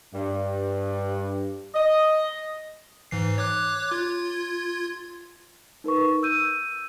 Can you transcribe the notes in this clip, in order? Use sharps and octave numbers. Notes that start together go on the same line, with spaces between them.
G2
D#5
G#2 E3 C7
C#5 D6 F#6
F4 G#6
D#4 A#4 B4 C#6
E6 G6 D#7